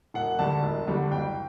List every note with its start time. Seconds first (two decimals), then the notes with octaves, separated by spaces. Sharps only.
0.14 E1 F#5
0.39 D2 D3 G3 A5
0.63 E1
0.87 D2 D3 G3
1.11 F#1 G5